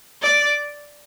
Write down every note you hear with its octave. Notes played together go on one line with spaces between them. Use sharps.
D5